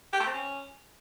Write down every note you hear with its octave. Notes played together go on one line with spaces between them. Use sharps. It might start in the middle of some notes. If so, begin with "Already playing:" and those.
G4
A3
C4
C#4